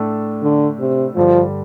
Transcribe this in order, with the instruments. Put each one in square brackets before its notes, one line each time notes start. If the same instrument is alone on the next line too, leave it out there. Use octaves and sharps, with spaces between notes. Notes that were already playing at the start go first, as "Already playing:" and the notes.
Already playing: [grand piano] A2 A3 D4 A4
[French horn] D3
C3
[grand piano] G2 D3 G3 [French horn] F3